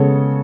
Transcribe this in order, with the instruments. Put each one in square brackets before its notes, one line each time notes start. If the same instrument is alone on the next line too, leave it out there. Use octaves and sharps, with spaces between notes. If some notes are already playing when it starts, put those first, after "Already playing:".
Already playing: [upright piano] C#3 G#3 B3 A4 C#5